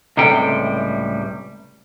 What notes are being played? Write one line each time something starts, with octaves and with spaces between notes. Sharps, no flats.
C#2 A2 C3 G3 A4 G5